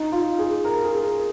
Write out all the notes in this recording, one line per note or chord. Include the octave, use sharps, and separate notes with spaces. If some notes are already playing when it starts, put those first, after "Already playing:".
Already playing: D#4
F4
G#4
A#4
G#4
A#4